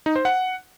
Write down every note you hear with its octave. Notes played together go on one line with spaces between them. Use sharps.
D#4
C5
F#5